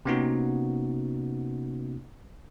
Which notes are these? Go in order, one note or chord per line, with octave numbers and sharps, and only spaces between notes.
C3 A#3 B3 C#4 D#4 F#4